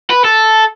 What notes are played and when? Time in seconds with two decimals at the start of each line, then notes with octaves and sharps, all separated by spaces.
0.10 B4
0.24 A4